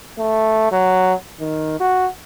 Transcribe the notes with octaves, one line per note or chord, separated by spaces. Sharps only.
A3
F#3
D#3
F#4